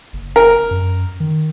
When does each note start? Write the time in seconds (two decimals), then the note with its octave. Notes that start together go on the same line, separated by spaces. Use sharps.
0.13 F#1
0.36 A#4
0.71 F#2
1.20 D#3